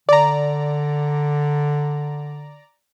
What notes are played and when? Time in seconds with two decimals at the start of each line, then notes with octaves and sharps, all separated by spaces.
0.09 D3 D5 A#5